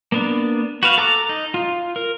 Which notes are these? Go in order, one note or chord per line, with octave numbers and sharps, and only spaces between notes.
A#3 B3 D4
F#4 B4 F5
A4 A#5 D6
D#4
F4
A#4